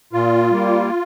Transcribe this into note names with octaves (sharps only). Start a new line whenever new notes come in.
A#2 F4
G3 A#3